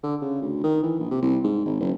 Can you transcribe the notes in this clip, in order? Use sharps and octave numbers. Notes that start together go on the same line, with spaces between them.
D3
C#3
D2
D#3
E3
A#1
C3
C2
G#2
G#1
F#1